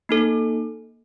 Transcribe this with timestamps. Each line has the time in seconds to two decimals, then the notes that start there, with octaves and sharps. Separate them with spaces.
0.09 A#3 D#4 A4